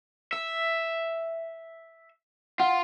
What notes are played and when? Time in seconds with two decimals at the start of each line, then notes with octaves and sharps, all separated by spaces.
0.33 E5
2.60 F4 F#5